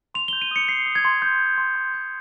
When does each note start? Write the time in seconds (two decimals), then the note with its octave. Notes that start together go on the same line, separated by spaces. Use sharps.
0.14 C6 F7
0.28 G7
0.33 G6
0.42 D#7
0.51 D#6 C#7
0.68 G6 C7
0.86 D#6
0.95 G#6
1.05 C6
1.22 C6 G6
1.40 D#6
1.58 C6
1.75 C6
1.94 G6